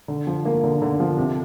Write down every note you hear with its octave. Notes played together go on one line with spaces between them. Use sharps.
D3
F3
A#3
D3
D3
F3
C3